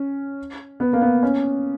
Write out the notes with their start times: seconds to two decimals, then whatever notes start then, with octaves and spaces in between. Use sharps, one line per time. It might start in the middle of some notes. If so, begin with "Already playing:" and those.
Already playing: C#4
0.80 B3
0.93 A#3
1.02 B3
1.23 C#4